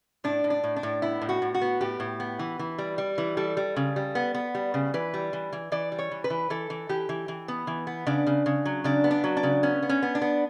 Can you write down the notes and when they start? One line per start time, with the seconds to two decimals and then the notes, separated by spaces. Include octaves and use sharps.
0.24 A2 D4
0.44 A2
0.50 D4
0.64 A2
0.76 D4
0.83 A2
1.02 B3 E4
1.22 A2
1.29 F#4
1.42 A2
1.55 F#4
1.62 B3
1.81 A2 G4
2.00 A2
2.20 B3
2.39 E3
2.59 E3
2.78 G3
2.98 G3
3.18 E3
3.37 G3 A4
3.57 G3
3.76 C#3
3.96 G3
4.15 B3
4.35 B3
4.55 G3
4.74 C#3
4.94 E3 B4
5.14 G3
5.33 E3
5.52 E3
5.72 E3 D5
5.92 G3
5.99 C#5
6.11 E3
6.24 B4
6.30 E3
6.50 E3 A4
6.70 E3
6.89 E3 G4
7.09 E3
7.28 E3
7.48 B3
7.67 E3
7.87 B3
8.07 C#3 D4
8.27 C#3
8.46 C#3
8.66 F#3
8.84 C#3 D4
9.04 B3
9.11 D4
9.24 F#3
9.37 D4
9.43 C#3
9.63 B3 C#4
9.83 B3
9.89 C#4
10.02 B3
10.15 D4
10.22 B3